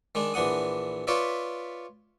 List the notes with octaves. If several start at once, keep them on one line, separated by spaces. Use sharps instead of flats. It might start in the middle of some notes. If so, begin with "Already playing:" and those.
D#3 G#3 D4
A#1 E3 D4 F#5 D#6
F4 B4 C#5 D5 E5